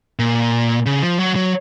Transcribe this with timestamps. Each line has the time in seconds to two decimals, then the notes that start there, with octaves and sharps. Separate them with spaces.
0.19 A#2
0.86 C#3
1.02 F3
1.18 F#3
1.36 F#3